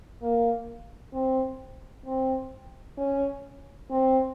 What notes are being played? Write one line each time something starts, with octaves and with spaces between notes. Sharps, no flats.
A#3
C4
C4
C#4
C4